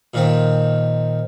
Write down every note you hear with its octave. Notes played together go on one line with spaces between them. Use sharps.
A#2 D#3 C4